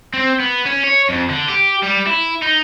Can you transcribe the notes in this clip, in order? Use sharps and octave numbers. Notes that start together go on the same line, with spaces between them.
C4
B3
C#4
C#5
F2
D3
G4
G3
E4
D#4